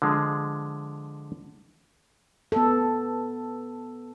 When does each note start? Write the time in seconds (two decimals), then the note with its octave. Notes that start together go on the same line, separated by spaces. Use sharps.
0.02 D3 F3 G#3
2.52 B3 A4